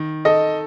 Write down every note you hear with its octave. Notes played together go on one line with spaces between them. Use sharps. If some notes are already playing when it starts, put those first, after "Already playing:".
Already playing: D#3
A4 D#5